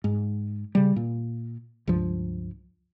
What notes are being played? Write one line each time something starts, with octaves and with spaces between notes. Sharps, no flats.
G#2
C#3 G3
A#2
C#2 G2 F3